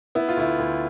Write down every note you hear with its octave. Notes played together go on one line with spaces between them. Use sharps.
B3 E4
F4
D2 E4
D2